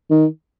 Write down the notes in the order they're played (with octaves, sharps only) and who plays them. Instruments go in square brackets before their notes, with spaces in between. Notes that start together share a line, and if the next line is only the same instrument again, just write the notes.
[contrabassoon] D#3